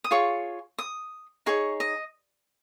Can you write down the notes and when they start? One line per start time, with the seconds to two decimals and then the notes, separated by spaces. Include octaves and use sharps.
0.04 D#6
0.11 F4 G#4 C#5 C#6
0.79 D#6
1.46 D#4 G#4 C#5 C#6
1.80 D#5